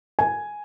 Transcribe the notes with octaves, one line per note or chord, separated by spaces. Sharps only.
G#5